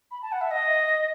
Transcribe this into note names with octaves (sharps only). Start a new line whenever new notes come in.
B5
A5
F#5
E5
D#5